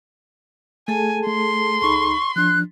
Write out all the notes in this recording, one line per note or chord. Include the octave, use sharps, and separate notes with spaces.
A3 G#4 A4 G#5 A5
A3 C6
C#2 D#4 B5 C#6
F3 D4 F#6